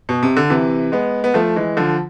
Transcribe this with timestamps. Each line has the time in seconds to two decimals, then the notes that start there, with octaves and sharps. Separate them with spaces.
0.09 B2
0.23 C3
0.37 D3
0.50 C3 E3
0.92 G#3 B3
1.24 B3
1.34 F3 A3
1.56 E3 G#3
1.77 D3 F3